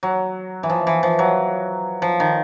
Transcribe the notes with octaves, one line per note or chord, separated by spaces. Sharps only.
F#3
E3
F3
E3
F3
F#3
F3
D#3